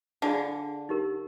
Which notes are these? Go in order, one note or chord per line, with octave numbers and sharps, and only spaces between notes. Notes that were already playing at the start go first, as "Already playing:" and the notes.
D3 D4 F4 G#4 D5 F5
D#4 G4 A#4